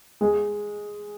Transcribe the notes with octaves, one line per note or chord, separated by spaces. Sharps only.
G#3 G#4